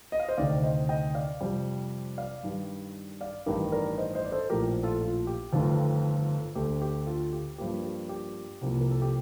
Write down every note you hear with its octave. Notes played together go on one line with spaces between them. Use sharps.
D#5
F5
C5 D#5
D2 C3 D#3 D5 F5
C5 D#5
D#5 G5
D5 F5
F2 C3 G3
D5 F5
G2 D#3 G3
D5 F5
A1 G2 D#3 G4 A#4
A#4 D5
C5 D#5
C5 D#5
D5
A4 C5
A#1 A2 F3 G4 A#4
F4 A4
F4
G4
G1 F2 D#3 A3 F4
D2 D3 A3 G4
G4
F4 A4
G4
G2 F3 A#3 G4
G4
G4
C2 C3 F3 A#3
A#4
A4
G4